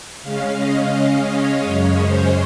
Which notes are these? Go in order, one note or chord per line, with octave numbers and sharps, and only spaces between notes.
C#3 G#3 C#4 F5
D#5
F5
C#5
F#2 C#3 G#3 C#4
C5